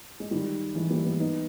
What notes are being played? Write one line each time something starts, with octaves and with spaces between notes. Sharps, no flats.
G#3
D#3 G3
E3 G#3
G3 A#3
G#3 B3
B3 D#4